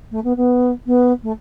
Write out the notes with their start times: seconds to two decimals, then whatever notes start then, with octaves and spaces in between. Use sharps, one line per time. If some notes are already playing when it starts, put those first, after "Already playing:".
0.11 A3
0.24 B3
0.37 B3
0.86 B3
1.23 A3